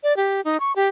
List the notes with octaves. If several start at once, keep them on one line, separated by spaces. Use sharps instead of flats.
D5
G4
D#4
C#6
G4